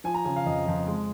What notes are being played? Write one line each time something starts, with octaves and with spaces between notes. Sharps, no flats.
F3 G#5
A#5
C#3 G#5
F5
F2 D#5
F2
G#3